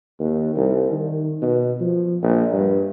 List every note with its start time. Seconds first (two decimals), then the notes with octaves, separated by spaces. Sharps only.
0.20 D#2
0.55 C2
0.91 D#3
1.42 B2
1.80 F3
2.23 A#1
2.53 G2